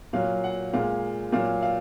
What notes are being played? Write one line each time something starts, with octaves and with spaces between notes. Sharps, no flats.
A#2 F#3 F5
F#5
A#2 G#3 F5
A#2 F#3 F5
F5